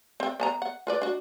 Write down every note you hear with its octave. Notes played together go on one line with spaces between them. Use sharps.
C4 G5
B3 A5 A#5
F#5
F4 B4 D5
D4 F#4